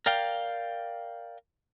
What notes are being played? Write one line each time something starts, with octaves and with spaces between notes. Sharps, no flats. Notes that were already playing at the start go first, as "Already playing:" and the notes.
A#4 D5 F5 G5